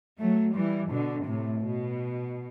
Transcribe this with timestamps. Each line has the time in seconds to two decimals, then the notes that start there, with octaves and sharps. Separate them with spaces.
0.20 F#3 A3
0.55 E3 G3
0.90 B2 D3
1.26 A2 C3
1.62 B2